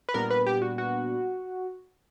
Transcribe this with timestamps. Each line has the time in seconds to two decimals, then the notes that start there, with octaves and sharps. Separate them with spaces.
0.09 B4
0.14 A#2 G3 B3 D4 A#4
0.30 B4
0.46 G4
0.62 F#4
0.78 F#4